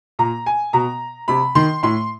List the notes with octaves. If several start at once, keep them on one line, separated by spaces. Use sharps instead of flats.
A#2 A#5
G#5
B2 A#5
C3 B5
D#3 C6
A2 C6